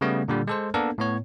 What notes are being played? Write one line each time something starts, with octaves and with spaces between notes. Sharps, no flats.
C#3 G3 A3 B3
A#2 D3 G3
G#3 A4 C5
A#3 B3 D4 A4 A#4
A2 B3 C#5